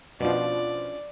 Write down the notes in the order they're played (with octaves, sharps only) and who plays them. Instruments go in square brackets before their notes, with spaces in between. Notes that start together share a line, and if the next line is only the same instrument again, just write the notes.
[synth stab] B2 F3 [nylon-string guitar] C#4 D4 F4 [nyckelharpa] D5